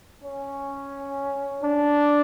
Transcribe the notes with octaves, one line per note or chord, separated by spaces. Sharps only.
C#4
D4